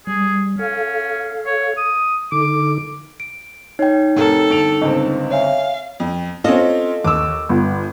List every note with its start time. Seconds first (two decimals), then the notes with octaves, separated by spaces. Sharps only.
0.07 G3 G#4
0.59 C#4 A4 F5
1.46 C#5
1.77 D#6
2.32 D3 D#4 A4 D6
3.20 D7
3.79 D#4 C#5 G5
4.16 F1 C3 A4 A#4
4.50 G1 D7 F7
4.81 G1 C#2 C4 D#5
5.31 C#5 E5 F5 G#5
6.00 F2
6.44 C4 C#4 F4 A4 D#5
7.04 D#2 D6 E6
7.49 G1